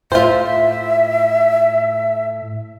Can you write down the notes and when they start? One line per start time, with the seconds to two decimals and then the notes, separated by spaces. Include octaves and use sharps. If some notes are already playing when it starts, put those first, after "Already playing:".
0.12 A2 F4 C5 E5